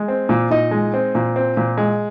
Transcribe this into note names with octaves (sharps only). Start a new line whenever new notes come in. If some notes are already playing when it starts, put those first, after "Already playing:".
Already playing: G#3
C4
A#2
A#2 D#4 D#5
G#3
C4
A#2
C4
A#2
G#3